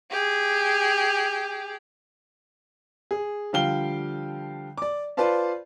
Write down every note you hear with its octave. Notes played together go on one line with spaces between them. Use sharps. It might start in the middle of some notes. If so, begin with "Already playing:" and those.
G4 G#4
G#4
D3 F3 G3 F5 G5 G7
D5 D6
F4 B4 C5 D5 F5 A5